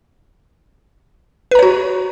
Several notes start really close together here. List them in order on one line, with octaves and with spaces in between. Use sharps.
B4 A#5 C#5 F#4